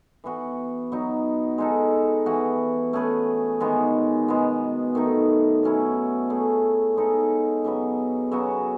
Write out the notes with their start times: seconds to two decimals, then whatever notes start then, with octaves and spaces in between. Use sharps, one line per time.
0.24 E3 B3 F#4
0.92 F#3 B3 D#4
1.58 G#3 D#4 A4
2.26 E3 B3 F#4
2.93 A3 C#4 G#4 B4
3.60 D#3 G#3 B3 F#4
4.28 B2 G#3 B3
4.95 D#3 A3 D#4
5.63 B2 F#3 C#4 E4
6.30 A3 E4 G#4
6.96 G#3 B3 D#4 A4
7.65 C#3 F#3 B3
8.32 C#3 F#3 B3 F#4